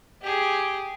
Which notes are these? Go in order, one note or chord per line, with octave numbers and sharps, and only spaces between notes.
G4 G#4